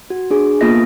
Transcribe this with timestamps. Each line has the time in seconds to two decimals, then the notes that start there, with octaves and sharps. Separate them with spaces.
0.10 F#4
0.31 D4 G#4
0.61 A#3 B3 F4 A4 D#5 A#6